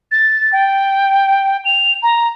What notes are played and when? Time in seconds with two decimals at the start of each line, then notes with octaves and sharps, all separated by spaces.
0.11 A6
0.53 G5
1.65 F7
2.03 A#5